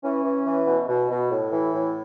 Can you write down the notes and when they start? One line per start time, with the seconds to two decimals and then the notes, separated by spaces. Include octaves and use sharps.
0.03 E3 C#4
0.24 E3
0.45 E3
0.67 B2
0.88 B2
1.09 B2
1.30 A2
1.51 E3
1.73 A2